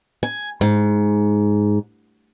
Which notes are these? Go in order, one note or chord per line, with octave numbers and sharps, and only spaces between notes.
G#5
G#2